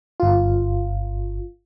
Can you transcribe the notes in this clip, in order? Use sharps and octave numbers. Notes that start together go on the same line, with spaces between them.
G1 F4